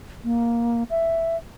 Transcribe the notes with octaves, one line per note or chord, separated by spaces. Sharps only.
A#3
E5